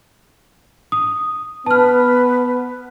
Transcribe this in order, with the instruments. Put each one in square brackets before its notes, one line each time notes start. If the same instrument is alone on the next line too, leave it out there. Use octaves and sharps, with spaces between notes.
[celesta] D#6
[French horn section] B3 [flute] B4 [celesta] A5 F6